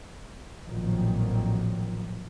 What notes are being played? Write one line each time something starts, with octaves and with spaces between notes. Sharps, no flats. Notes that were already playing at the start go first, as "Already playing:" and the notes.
A1 F2 A#2 D#3 F3 F#3